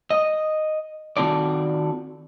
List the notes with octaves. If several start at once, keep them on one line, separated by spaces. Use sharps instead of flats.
D#5
D#3 C4 F4 F#4 A4 D5